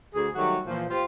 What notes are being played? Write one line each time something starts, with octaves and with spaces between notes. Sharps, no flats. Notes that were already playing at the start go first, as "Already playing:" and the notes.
D2 G#4
D#3 F#3 G3 A3 F#4 C#5
A#2 E3 F3
F4 G4 C5